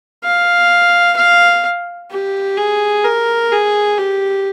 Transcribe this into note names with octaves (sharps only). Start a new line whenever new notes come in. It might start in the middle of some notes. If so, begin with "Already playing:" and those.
F5
F5
G4
G#4
A#4
G#4
G4